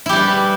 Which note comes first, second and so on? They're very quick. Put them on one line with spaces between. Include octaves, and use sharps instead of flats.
E4 G4 G3 B4